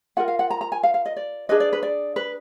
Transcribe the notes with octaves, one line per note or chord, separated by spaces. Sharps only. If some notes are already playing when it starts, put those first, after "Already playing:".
F4 A#4 F#5
F5
F#5
A#5
A#5
G#5
F5
F5
D#5
D5
D4 G#4 B4 D#5
D5
B4
D5
B4